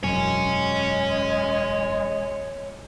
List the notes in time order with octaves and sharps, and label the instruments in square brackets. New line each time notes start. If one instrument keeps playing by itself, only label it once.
[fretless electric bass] E1 F#2 [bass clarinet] G#3 [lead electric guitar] C#5 G#5